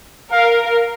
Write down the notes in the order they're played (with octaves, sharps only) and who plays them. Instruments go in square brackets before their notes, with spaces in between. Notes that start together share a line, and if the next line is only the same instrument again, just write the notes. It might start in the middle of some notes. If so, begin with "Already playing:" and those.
[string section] A#4 [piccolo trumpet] F5